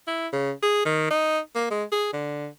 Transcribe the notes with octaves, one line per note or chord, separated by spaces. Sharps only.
E4
C#3
G#4
D#3
D#4
A#3
G#3
G#4
D3